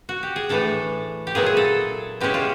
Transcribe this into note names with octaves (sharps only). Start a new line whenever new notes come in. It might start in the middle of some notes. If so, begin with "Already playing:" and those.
F#4
G4
G#4
A2 E3 A3 D4 A4
G4
A#2 F#3 B3 E4 G#4
G#4
A4
B2 G#3 C#4 E4 G4
F4